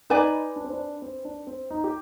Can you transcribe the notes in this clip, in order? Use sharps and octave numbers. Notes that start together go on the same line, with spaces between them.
D#4 B4 D5 G#5
D4
C4
D4
C4
D4
C4
D#4
G4